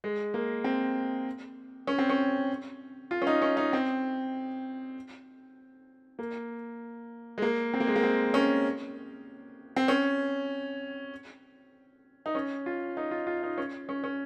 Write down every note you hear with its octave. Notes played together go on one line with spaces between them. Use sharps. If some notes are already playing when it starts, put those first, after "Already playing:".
G#3
A#3
C4
C#4
C4
C#4
F4
C#4
D#4
C#4
D#4
C4
A#3
G#3
A#3
C4
A#3
G#3
A#3
C4
C#4
C4
C#4
D#4
C#4
F4
D#4
F4
F4
D#4
C#4
C#4
C#4